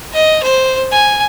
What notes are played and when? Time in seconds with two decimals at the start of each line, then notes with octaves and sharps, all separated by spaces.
0.13 D#5
0.43 C5
0.92 G#5